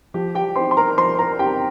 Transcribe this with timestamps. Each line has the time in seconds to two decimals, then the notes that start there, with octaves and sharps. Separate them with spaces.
0.14 F3 G4
0.35 G4 G5
0.56 C4 D#4 C5 C6
0.71 C6
0.77 A#4 A#5
0.98 F3 C5 C6
1.19 A#4 A#5
1.39 C4 D#4 G4 G5